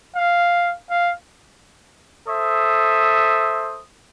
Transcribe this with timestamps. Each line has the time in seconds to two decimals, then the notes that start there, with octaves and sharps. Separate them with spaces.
0.16 F5
0.90 F5
2.28 A4 C5 E5 D#6